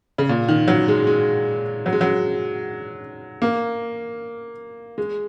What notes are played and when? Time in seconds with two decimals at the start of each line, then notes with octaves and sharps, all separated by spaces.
0.18 C#3
0.29 A#2
0.48 D#3
0.68 F#3
0.88 G#3
1.07 G#3
1.86 F#3
1.93 G#3
2.01 F#3
3.42 A#3
4.98 G#3